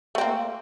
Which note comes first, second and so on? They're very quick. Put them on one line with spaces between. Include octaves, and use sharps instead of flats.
A3 C4 A#3